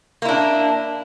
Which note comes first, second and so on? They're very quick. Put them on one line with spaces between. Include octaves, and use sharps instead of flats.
A#3 E4 D4